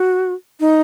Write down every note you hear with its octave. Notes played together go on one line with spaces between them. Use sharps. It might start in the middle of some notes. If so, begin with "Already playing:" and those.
Already playing: F#4
D#4